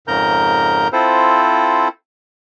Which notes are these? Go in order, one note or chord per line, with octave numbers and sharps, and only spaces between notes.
F2 G#2 C#3 A#4 A#5 G6
C4 E4 F4 A4 C5